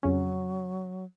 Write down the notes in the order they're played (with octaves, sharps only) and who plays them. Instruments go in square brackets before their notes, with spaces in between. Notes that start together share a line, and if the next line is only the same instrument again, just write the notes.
[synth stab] F2 C#3 C#4 [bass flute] F#3